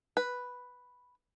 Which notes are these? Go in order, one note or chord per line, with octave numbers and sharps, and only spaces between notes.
B4